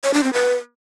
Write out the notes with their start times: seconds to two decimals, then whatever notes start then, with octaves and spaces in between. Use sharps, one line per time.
0.04 C#5
0.14 D4
0.23 C4
0.33 B4